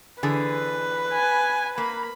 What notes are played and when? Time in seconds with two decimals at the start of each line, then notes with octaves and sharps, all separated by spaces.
0.23 D3 E3 G#4 B4
1.12 G#5
1.78 A#3 B5